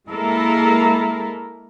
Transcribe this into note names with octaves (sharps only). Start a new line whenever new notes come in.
G#3 A#3 E4 A4 A#4